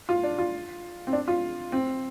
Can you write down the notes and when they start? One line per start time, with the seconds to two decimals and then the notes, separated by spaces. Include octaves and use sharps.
0.09 F4
0.23 D4
0.38 F4
1.07 C4
1.13 D4
1.28 F4
1.72 C4